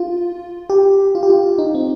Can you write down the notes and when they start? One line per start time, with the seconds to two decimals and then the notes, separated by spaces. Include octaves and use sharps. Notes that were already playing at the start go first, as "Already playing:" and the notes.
Already playing: F4
0.70 G4
1.15 F4
1.23 G4
1.30 F4
1.58 D#4
1.75 C4